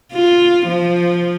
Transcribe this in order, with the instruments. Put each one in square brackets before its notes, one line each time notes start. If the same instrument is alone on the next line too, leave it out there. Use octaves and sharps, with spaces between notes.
[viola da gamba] F4
F3